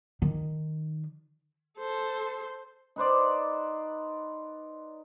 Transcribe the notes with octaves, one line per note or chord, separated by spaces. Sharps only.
D#3
A4 C5
D#4 B4 C5 D5